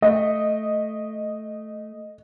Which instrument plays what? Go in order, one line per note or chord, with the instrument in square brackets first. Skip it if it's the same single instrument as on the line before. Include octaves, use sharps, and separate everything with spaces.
[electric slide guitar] A3 [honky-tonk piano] D#5